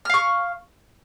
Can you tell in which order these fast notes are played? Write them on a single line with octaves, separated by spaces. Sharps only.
F6 F5 C#6